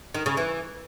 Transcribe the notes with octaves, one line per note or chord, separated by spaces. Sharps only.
D#3
C#3
E3